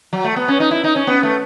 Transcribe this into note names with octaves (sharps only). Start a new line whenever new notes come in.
F#3
A3
B3
C#4
D#4
E4
D#4
C#4
B3
A3